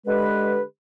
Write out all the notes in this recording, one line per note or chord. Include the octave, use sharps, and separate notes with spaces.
D3 G#3 G4 B4